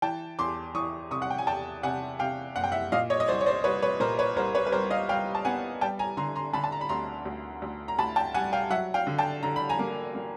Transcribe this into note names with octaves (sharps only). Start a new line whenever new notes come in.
E3 G5 A5
E2 C6 D6
E3 C#6 D#6
C3 C#6 D#6
F#5
G5
G#5
E2 G5 A5
C3 F#5 G#5
C3 F5 G5
F#1 F#5
G5
E5 F#5
A#2 D#5 F5
C#5 D#5
D#5
C2 C5 D5
C#5
C5 D5
C2 B4 C#5
B4 C#5
A#2 A#4 C5
B4 C#5
C2 A#4 C5
B4 C#5
B4
G3 A#4 C5
D#5 F5
G3 F5 G5
A5
B3 F#5 G#5
G3 G5 A5
G#5 A#5
D3 A#5 C6
A#5 C6
D3 A5 B5
A5
A#5
B5
D2 A#5 C6
D2
D2
A#5
D2 A5 B5
G5 A5
G3 F#5 G#5
F5 G5
F#3 E5 F#5
F5 G5
D3
G5 A5
D3 A#5
B5
G#5 A#5
A#3
A#3